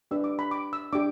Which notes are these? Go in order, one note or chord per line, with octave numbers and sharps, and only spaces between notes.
D4 G4 B4 E6
D6
B5
D6
E6
D4 G4 D6